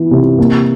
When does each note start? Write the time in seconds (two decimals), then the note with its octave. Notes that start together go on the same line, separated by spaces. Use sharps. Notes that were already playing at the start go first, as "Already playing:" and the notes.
Already playing: E3 B3
0.11 C3
0.38 A#3